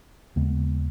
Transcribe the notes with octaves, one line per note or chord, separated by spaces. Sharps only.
D#2 C#3 G#3 B3